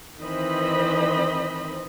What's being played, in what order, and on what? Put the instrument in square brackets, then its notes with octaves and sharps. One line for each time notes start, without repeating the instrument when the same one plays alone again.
[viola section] D#3 E3 C4 C5 D#5 B5